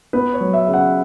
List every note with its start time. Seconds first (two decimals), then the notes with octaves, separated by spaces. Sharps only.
0.13 B3 B4
0.33 C#5
0.40 F#3
0.53 E5
0.67 C#3
0.74 F#5